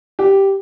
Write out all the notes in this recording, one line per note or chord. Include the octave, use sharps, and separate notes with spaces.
G4